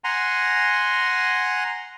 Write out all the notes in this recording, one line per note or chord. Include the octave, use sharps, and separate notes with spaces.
F#5 G#5 A#5 C6